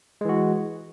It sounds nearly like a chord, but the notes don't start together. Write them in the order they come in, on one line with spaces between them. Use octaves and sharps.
G#3 E3 F#4